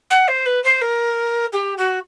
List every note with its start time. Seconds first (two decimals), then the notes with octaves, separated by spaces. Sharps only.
0.10 F#5
0.28 C5
0.46 B4
0.64 C5
0.81 A#4
1.53 G4
1.78 F#4